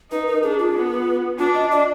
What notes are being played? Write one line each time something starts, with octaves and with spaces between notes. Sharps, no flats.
D#4 B4
A#4
D4 G#4
F4
B3
D4 F4
D#5
D5